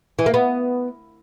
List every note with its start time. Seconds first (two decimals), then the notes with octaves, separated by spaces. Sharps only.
0.19 E3
0.26 A#3
0.34 B3